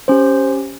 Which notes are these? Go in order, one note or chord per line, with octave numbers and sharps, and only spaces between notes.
C#4 G4 C5